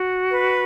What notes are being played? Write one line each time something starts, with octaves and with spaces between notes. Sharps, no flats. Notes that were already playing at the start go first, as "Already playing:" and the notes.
Already playing: F#4
B4